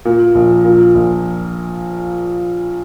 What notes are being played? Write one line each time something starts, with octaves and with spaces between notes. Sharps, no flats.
A#2
A#1
A#2
A#1